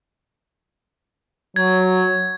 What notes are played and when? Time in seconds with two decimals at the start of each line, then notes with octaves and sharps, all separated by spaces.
1.56 F#3 G#6